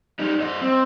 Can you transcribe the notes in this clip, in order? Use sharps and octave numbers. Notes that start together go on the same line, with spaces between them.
G3 D#4
G2 D#5
C4